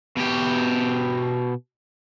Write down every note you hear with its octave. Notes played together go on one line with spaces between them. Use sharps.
B2 G4